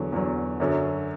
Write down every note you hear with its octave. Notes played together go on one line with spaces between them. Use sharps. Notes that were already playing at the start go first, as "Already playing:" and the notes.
Already playing: E2 D3 F#3
E2 D3 F#3
F#2 D3 F#3